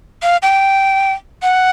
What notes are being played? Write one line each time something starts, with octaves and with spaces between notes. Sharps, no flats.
F5
G5
F#5